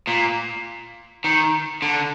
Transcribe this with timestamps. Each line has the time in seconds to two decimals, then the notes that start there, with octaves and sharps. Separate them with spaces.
0.07 A#2
1.24 D#3
1.82 D3